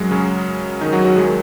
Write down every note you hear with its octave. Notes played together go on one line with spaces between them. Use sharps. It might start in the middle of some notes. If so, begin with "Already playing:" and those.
Already playing: F#2 F#3 G#3
C#3 C#4
D#3 D#4
F#3 F#4
F#3 F#4
A#1 D#3 F#3 G#3 G#4